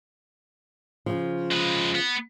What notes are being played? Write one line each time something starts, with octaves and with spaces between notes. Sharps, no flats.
C#3 F3
G#3 B4
B3